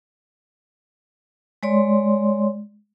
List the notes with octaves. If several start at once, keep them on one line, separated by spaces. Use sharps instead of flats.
G#3 C#5 D5 C6